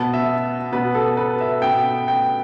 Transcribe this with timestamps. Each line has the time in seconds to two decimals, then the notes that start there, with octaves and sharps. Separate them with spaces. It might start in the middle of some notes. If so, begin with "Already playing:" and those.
Already playing: B2 B3 A5
0.14 E5
0.72 B2 B3 B4
0.95 A4
1.17 B4
1.41 E5
1.62 B2 B3 G5
2.08 G5